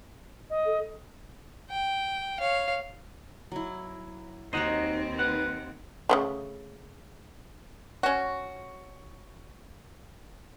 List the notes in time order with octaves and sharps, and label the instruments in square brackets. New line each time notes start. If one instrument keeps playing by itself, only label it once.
[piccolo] D#5
[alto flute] A4
[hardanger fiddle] G5
C#5 F5
[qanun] F#3 E4
[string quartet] D#2 C4 [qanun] D#4 F#4 C#5 [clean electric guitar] C5 D#5 F#5
[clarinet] B4 [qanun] F5 [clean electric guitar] F#5
[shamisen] C#3 E3 A3
[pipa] C#4 F#4